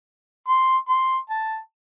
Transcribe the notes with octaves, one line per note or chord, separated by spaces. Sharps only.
C6
C6
A5